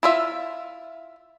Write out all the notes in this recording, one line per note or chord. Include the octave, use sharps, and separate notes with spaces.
E4 F4 E5